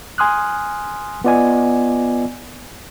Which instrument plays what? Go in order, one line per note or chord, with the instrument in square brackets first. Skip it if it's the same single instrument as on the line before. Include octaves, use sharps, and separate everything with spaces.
[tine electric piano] G#5 C6 D#6 F6 F#6
B3 F4 D5 D#5 G#5